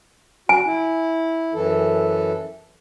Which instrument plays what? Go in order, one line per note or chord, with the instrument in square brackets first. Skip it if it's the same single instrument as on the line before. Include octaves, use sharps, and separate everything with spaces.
[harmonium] F#4 [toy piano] G#5
[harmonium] E4
F#2 E3 A4